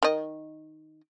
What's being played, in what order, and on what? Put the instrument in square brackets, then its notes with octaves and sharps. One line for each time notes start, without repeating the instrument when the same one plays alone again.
[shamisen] D#3 D#5